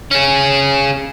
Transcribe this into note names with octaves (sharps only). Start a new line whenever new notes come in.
C#4 G#4